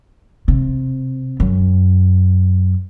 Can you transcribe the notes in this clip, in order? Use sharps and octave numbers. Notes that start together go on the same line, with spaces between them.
C3
F#2